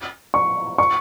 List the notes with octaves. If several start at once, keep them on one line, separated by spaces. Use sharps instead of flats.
C#6
C#6